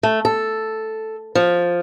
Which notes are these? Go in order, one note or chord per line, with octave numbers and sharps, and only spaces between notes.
A3
A4
F3